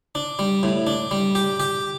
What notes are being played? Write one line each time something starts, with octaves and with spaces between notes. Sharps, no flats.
D4
G3
A2
D4
G3
G4
G4